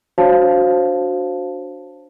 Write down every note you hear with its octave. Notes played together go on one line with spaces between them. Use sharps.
D4 F#4 C5 C#5 F5 A5